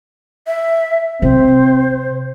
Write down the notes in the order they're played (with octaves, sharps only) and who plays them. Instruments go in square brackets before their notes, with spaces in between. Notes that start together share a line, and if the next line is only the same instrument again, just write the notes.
[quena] E5
[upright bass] C3 [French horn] C4 [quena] C5